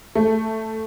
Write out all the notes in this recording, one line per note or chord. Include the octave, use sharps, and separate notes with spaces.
A3